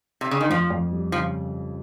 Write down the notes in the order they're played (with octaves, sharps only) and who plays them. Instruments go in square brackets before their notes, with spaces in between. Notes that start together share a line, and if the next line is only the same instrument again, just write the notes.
[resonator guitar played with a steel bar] C3
C#3
D#3
[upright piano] F2 [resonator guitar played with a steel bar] F3
[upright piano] F2
G3
[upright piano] C#3 [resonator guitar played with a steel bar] F3